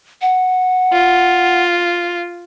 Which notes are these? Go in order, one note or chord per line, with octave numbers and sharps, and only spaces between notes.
F#5
F4